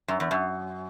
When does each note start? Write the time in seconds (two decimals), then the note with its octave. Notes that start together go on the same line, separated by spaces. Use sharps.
0.08 F#2
0.20 E2
0.31 F#2